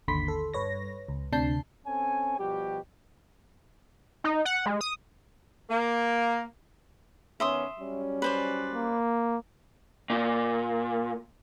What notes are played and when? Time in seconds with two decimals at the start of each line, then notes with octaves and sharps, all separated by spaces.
0.08 G#1 D#2 D3 B5 C6 B6
0.28 A4
0.54 G2 B4 C#5 A#6
1.09 C#2
1.33 D2 C3 D4 A5 G6 C7
1.86 C4 C#4 A4 C#5 G#5
2.38 B2 F3 G3 F#4 G4
4.24 D#4
4.45 F#5
4.66 G#3
4.81 D#6
5.69 A#3
7.40 D#3 B3 C#4 E5 C6 D#6
7.80 F#3 G3 C#4
8.22 B4 C5 D5
8.73 A#3
10.10 A#2